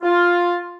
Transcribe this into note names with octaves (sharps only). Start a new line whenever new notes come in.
F4